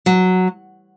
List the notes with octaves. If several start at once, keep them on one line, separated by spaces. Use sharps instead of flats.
F#3